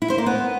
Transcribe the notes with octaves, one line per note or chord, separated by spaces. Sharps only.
E4
C5
A#3
B3